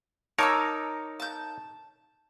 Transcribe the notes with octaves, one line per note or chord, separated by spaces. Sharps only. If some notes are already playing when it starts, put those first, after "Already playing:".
D#4 A#4 C#5 A5 D6 E6
A5 G6